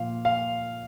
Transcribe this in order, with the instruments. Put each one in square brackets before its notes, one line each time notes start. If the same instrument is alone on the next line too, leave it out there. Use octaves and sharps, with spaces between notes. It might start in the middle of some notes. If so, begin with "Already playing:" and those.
Already playing: [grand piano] A#2 F3 F5
F5